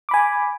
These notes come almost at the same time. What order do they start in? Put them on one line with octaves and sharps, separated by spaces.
D6 B5 G#5